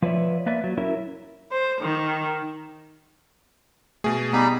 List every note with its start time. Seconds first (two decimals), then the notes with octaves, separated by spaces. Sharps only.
0.02 F3 B4 C#5 D5 E5
0.46 A#3 B4 D5 E5
0.64 F#3
0.77 F#3 C#4 E4 A#4 E5
1.51 C5
1.81 D#3
4.04 B2 A3 G#4
4.33 G3 B3 D#4 B5